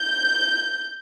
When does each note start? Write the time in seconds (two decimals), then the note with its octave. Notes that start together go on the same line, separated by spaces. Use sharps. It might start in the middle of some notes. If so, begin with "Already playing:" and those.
Already playing: G6